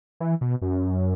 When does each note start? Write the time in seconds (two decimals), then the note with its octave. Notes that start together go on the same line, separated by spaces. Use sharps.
0.20 E3
0.41 B2
0.62 F#2